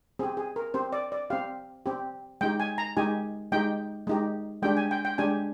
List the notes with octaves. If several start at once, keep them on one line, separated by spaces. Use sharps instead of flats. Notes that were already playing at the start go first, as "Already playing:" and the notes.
C4 G4 G#4
G#4
A#4
C4 G4 C5
D5
D5
C4 G4 F5
C4 G4
G#3 D#4 G4 G5
G#5
A#5
G#3 D#4 G4 G#5
G#3 D#4 G4 G5
G#3 D#4 G4
G#3 D4 G4 G5
G#5
G5
G5
G#3 D4 G4 G#5